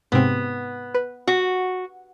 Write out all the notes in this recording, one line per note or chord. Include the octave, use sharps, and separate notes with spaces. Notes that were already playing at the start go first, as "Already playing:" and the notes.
G#2 C3 B3 C4
B4
F#4